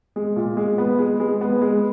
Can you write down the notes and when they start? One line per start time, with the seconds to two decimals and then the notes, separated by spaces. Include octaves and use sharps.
0.16 G#3
0.36 A#2
0.57 G#3
0.78 B3
0.99 G#3
1.20 G#3
1.41 B3
1.61 G#3